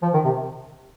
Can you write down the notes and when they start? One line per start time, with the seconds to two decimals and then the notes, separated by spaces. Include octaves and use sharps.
0.02 F3
0.14 D#3
0.25 C3